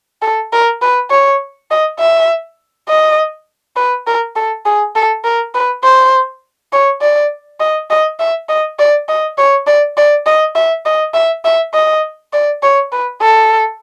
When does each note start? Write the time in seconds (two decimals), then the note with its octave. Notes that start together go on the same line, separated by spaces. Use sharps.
0.22 A4
0.53 A#4
0.82 B4
1.11 C#5
1.71 D#5
2.00 E5
2.89 D#5
3.76 B4
4.07 A#4
4.36 A4
4.66 G#4
4.96 A4
5.24 A#4
5.54 B4
5.83 C5
6.73 C#5
7.02 D5
7.60 D#5
7.90 D#5
8.19 E5
8.49 D#5
8.79 D5
9.09 D#5
9.38 C#5
9.67 D5
9.97 D5
10.26 D#5
10.55 E5
10.85 D#5
11.14 E5
11.45 E5
11.74 D#5
12.33 D5
12.63 C#5
12.92 B4
13.22 A4